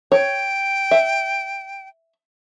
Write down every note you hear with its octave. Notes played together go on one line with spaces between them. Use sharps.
C#5 G5
E5